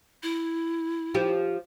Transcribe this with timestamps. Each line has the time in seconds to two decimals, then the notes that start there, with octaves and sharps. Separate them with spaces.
0.23 E4
1.14 F3 G4